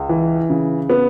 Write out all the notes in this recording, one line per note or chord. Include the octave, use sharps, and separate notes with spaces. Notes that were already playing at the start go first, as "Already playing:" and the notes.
Already playing: C#2
E3
C#3
B3